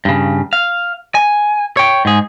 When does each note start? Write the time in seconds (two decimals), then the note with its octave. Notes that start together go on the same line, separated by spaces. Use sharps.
0.05 G2 C#3
0.53 F5
1.15 G#5
1.77 C#5 G5
2.05 G#2 G#4